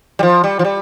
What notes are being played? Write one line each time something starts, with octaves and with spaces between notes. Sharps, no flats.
G3
F3
G3
F3
G3